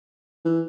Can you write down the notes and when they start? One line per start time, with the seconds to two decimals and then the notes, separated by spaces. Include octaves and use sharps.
0.45 E3